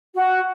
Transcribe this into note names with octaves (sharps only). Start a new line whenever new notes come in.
F#4